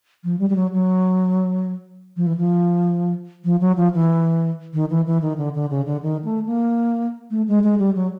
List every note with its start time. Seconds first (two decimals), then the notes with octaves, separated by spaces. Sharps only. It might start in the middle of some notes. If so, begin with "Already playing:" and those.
0.24 F3
0.39 G3
0.49 G3
0.56 F#3
0.72 F#3
2.17 F3
2.27 E3
2.37 F3
3.45 F3
3.61 F#3
3.77 F3
3.94 E3
4.74 D#3
4.90 E3
5.07 E3
5.22 D#3
5.38 D3
5.55 D3
5.70 C#3
5.86 D3
6.02 D#3
6.25 A3
6.46 A#3
7.31 A3
7.48 G#3
7.64 G#3
7.79 G3
7.95 F#3